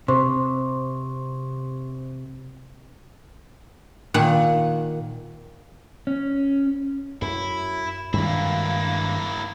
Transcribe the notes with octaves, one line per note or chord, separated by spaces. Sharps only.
C3 C5 C6 C#6
A#2 D#3 F#5
C#4
F#2 E4
G2 D#3 G#3 A#3 E4